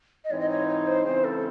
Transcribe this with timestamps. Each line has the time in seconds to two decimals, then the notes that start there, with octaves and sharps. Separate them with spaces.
0.24 D#5
0.31 G#2 E3 C4 D#4 C#5
0.40 D#5
0.49 C#5
0.68 C#5
0.87 C5
1.05 C#3 E3 G#3 C4 C5
1.24 A4